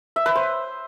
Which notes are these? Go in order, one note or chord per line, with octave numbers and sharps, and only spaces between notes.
E5
B4
C5